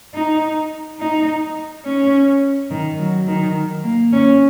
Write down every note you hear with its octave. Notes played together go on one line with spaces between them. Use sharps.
D#4
D#4
C#4
D#3
F#3
D#3
A#3
C#4